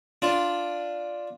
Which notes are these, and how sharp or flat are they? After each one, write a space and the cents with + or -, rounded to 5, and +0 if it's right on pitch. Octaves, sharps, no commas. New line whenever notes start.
D4 +0 F4 +0